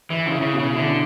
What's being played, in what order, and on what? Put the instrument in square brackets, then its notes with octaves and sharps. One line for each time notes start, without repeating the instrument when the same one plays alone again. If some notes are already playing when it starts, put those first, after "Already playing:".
[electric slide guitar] E3 [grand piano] E4
[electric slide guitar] C#3
[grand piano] E4
[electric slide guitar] C#3
[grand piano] B2
[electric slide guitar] C#3
[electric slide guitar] D3 [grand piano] E4